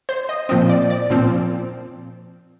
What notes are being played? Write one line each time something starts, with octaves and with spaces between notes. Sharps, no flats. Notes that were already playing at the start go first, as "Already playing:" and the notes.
C5
D#5
A#2 F3 C4 D#5
D5
D5
A#2 F3 C4